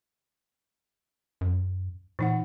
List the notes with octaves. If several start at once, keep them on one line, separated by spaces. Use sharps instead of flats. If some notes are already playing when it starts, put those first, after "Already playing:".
F#2
A#2 E3 D#4 F#5